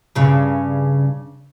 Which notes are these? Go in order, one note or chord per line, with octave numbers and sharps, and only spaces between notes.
G2 C#3